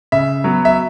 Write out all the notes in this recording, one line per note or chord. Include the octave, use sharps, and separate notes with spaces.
C#3 E5
F#3 B3
E5